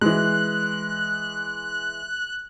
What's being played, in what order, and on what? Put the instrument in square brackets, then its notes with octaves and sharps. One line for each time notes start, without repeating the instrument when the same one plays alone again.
[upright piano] E3 G#3 [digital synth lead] F#6